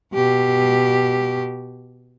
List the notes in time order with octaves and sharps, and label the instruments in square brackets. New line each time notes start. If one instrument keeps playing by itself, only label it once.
[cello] B2 G4